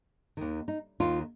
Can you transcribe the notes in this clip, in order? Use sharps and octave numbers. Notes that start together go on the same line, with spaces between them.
D#2 D#3
D#4
D#2 D#3 F4